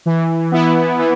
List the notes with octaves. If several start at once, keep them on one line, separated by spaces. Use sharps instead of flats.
E3
B3 E4
E3